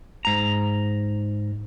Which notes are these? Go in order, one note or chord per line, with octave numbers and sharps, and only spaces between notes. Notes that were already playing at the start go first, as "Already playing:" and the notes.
G#2 A#5